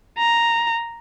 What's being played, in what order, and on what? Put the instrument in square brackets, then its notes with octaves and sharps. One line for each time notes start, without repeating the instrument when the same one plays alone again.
[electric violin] A#5